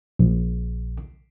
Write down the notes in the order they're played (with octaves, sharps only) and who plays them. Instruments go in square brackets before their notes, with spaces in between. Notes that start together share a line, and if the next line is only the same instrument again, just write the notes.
[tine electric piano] A#1